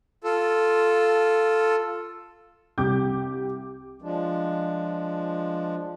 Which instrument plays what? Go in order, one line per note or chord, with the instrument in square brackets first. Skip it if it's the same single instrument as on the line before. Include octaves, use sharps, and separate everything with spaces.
[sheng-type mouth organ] F4 A4
[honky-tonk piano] C2 G4 D6 G6
[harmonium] F3 G#3 D4